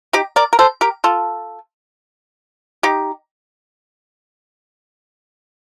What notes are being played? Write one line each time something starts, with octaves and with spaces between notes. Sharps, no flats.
D#4 G4
A#4 D5
A#4
A4 C5
G4 A#4
F4 A4
D#4 G4